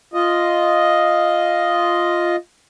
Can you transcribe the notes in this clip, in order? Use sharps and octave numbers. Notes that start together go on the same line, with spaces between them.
F4 D#5